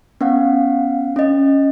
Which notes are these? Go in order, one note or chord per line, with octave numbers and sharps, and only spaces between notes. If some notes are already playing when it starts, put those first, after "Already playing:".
B3 C#4 F5 F#5
C#4 D#5